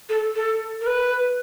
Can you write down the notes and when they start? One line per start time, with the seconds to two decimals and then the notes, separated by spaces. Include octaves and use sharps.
0.09 A4
0.36 A4
0.81 A#4
0.86 B4